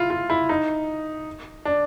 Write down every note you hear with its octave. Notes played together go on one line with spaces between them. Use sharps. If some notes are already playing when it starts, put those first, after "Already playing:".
Already playing: E4 F4
F4
E4
D#4
D4